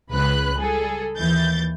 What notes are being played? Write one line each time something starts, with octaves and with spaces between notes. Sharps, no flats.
C#2 C#3 B4 B5 F#6
G3 G#4 A4
D#2 E3 G6 A6